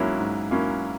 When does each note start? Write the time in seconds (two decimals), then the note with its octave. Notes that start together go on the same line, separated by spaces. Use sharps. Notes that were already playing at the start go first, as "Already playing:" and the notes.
Already playing: G#2 F#3 A#3 C#4 E4
0.20 G#2
0.51 F#3 A#3 C#4 E4